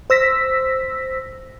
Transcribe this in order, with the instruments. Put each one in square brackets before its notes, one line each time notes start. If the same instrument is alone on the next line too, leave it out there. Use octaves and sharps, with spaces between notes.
[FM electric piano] C5 E6 A#6 B6